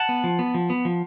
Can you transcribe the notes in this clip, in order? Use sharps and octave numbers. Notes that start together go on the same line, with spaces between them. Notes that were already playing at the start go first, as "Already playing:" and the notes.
Already playing: F#5 A5
B3
F3
B3
F3
B3
F3